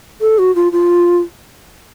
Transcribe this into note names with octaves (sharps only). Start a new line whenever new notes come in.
A4
F#4
F4
F4